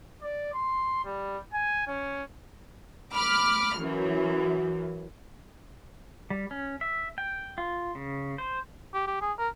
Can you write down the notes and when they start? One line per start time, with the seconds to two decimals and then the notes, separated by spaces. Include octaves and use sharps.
0.22 D5
0.53 C6
1.05 G3
1.53 G#5
1.87 C#4
3.14 B5 D6 F6
3.79 F#2 E3
6.30 G3
6.51 C#4
6.81 E5
7.18 G5
7.58 F4
7.95 C#3
8.38 C5
8.94 G4
9.07 G4
9.21 G#4
9.38 A#4